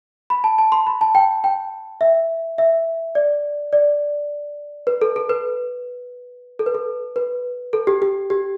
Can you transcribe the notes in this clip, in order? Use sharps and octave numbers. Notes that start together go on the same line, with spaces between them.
B5
A5
A5
C6
B5
A5
G5
G5
E5
E5
D5
D5
B4
A4
A4
B4
A4
B4
A4
B4
A4
G4
G4
G4